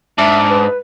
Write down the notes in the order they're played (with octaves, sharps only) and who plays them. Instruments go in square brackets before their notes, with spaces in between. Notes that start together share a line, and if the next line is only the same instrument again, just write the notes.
[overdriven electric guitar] G#2 [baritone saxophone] D4 [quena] E5
[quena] B4